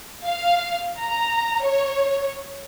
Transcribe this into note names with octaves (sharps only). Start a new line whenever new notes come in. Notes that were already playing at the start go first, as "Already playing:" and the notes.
F5
A#5
C#5